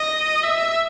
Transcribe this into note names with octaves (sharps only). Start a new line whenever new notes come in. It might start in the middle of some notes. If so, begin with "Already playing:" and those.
Already playing: D#5
E5